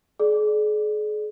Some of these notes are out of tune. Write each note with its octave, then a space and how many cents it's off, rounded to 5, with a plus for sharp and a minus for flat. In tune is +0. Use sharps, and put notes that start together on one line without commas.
G#4 +35 D5 +10